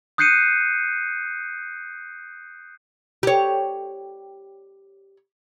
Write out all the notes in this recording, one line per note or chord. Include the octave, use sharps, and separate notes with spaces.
D#6 F#6 G6 C7 C#7 D#7
G4 C#5